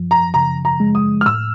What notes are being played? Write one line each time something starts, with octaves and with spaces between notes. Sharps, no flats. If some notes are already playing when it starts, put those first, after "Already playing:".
Already playing: F#2 F3
A#5
C#3 A#5
A#5
G#3
D#6
F6
A2 E6